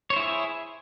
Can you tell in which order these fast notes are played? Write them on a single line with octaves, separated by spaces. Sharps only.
C#5 C5 E4 G#4 E5